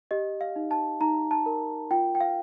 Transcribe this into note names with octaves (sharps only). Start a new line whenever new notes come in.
G4 D#5
F5
D#4
A5
D#4 A#5
A5
A#4
F4 G5
G5
F5